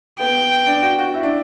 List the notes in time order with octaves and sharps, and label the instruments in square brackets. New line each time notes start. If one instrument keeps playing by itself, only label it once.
[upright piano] B3 [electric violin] G5
[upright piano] D4
F#4
F#4
E4
D4